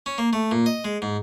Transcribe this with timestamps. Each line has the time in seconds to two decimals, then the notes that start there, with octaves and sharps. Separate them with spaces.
0.06 C#4
0.18 A#3
0.33 A3
0.51 A#2
0.66 D#5
0.85 G#3
1.02 G#2